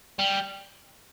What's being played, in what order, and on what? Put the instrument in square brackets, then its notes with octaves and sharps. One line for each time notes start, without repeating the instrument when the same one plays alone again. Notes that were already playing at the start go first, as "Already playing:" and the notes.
[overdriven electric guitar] G3